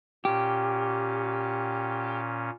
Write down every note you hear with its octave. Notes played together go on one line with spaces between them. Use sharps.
A#2 C#4 G4